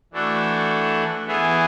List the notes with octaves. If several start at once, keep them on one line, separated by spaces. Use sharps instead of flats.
E3 A3 D4 F#4 A4
E3 B3 E4 G#4